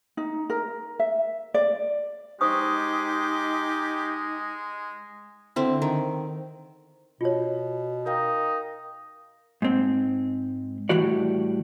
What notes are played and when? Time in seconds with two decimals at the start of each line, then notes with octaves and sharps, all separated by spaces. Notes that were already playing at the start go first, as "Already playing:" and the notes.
0.17 D#4
0.50 A#4
1.00 E5
1.54 D5
2.41 G#3 D#4 G4 C5 C#6 D#6
5.56 D3 C4 E4
5.82 D#3
7.21 B2 F4 C#5
8.06 D#4 A#4 F5 G5
9.62 G#2 C4
10.89 A2 E3 G3 F#4 D5